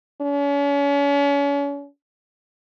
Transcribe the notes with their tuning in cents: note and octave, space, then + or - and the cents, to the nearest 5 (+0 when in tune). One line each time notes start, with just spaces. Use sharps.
C#4 +40